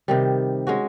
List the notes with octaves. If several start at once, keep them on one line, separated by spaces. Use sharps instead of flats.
C3 D#3 G3
G#3 C#4 F#4